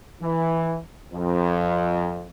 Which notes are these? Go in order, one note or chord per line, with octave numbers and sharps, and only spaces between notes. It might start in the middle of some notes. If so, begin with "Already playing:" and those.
E3
F2